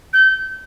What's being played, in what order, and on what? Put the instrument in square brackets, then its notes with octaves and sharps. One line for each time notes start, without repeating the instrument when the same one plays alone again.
[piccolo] G6